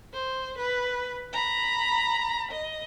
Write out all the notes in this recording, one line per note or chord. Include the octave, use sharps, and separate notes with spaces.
C5
B4
A#5 B5
D#5